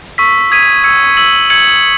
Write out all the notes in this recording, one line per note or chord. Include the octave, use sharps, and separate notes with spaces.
C#6 E6 B6
D#6 G#6 B6 D#7
E6 G#6 C#7
E6 B6 F#7
E6 G#6 C#7 F#7